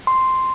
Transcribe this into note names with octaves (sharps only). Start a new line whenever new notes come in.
C6